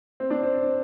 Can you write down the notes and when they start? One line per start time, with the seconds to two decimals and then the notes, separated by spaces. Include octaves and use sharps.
0.20 C4
0.30 D4
0.43 C4